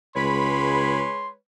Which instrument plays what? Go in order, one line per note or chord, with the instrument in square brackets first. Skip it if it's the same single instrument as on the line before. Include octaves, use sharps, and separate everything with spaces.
[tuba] C#2 [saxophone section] G#3 B4 C#5 [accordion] B5 [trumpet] C6